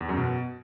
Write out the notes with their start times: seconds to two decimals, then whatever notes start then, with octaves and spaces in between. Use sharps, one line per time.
0.01 E2
0.09 F#2
0.17 B2